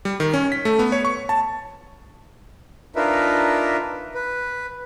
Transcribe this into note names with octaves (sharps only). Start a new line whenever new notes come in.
G3
D#3
C#4
B6
A3
B3
C#5
C#6
A5
D4 D#4 F4 A#4 B4 E5
B4